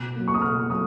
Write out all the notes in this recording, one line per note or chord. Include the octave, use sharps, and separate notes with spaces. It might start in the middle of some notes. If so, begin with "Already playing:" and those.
Already playing: B2 F#6
F#3 A#3
C#6
D#6
B2 F6
F#3 D#6